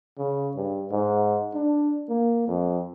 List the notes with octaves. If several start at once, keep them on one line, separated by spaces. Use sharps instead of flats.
C#3
G2
G#2
D4
A#3
F2